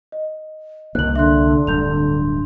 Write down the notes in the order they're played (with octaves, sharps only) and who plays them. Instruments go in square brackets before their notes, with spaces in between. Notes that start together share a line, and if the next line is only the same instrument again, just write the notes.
[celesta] D#5
[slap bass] C2 A#3 [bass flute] D#3 [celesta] F#6 F#7
[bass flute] D3 [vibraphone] D4 C6 [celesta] E5 F#6
[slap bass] D1 G2 [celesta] G6 F7